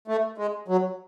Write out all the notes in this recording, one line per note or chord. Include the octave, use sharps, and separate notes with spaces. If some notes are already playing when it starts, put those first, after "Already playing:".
A3
G#3
F#3